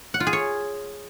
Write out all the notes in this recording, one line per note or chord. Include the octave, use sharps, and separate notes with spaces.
F#5
F4
G#4
C#5